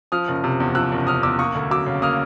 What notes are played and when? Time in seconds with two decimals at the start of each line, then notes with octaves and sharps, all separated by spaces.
0.12 F3 D#6 F6
0.28 F#1
0.44 C3
0.60 E2
0.75 F3 E6 F#6
0.92 F#1
1.07 C3 D#6 F6
1.23 E2 D6 E6
1.39 A#3 C#6 D#6
1.55 D2
1.71 F#3 D6 E6
1.86 C#3
2.02 A#3 D#6 F6